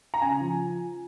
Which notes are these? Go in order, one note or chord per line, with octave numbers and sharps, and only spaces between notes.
A#5
C#3 G#5
F3